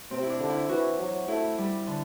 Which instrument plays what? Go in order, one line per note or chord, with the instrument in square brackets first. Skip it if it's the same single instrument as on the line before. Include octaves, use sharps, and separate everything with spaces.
[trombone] C3 [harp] C4
[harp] E4
D4
[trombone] D3
[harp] E4
[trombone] E3 [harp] F#4
[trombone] F#3
[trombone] A3 [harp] E4
[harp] G3
D3